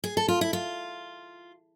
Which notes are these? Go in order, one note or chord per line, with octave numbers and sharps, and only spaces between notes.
G#4
A4
F4
E4
F4